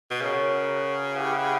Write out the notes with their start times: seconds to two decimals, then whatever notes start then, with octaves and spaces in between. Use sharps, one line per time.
0.11 B2
0.21 C#3 F#4 A#4 C#5 F#5
1.15 E4 G4 B4 F#5